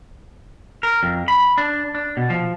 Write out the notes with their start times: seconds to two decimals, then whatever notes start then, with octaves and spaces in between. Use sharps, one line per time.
0.83 A#4
1.03 F2
1.28 B5
1.58 D4
1.95 D4
2.17 B2
2.30 F3